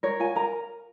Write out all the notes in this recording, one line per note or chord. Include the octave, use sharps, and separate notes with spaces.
A#4 C#5
F4 G#5
A#4 A#5